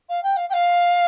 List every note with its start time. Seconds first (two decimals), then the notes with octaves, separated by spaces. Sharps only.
0.09 F5
0.23 G5
0.36 F5
0.49 G5
0.53 F5